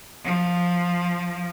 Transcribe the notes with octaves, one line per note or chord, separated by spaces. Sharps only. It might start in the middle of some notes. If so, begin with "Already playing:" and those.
F3